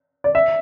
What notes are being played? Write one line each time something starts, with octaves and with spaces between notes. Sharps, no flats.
D5
E5